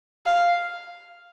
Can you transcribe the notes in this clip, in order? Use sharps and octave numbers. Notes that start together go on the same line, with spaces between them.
F5